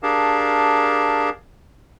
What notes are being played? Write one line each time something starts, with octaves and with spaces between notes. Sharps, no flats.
D4 G4 G#4 A#4 F5 A5